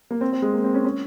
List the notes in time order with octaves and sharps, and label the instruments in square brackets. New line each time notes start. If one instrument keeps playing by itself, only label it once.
[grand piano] A#3
C4
C4
G#3
A#3
C4
C#4
C#4